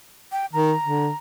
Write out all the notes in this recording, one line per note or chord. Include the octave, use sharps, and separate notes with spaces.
G5
D#3 A#5
D3